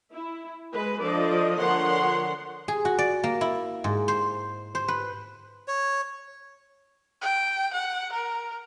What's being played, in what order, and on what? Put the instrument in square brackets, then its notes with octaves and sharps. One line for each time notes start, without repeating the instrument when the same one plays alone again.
[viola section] E4
G#3 B4
F3 D4 A4 D5 D#5
D3 F3 A#4 C#5 F#5 C6
[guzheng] G#4
F#4
D5
A#3
E4
G#2
C5
C5
B4
[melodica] C#5
[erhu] G5
F#5
A#4